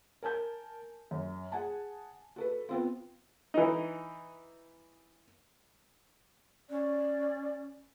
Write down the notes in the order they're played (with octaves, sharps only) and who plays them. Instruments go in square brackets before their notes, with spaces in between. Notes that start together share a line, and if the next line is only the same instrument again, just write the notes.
[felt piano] A#4 G#5 A5 G6
F#2
G#4 F#5 G#5 A5
F#4 A4 B4
B3 C4 F4
[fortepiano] E3 D#4
[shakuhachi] C#4 [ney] D5